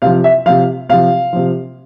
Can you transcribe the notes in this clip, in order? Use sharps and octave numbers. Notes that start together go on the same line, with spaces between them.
C3 F3 F5
E5
C3 F3 F5
C3 F3 F5
C3 F3